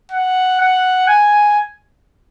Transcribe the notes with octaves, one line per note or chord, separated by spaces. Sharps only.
F#5
F#5
G#5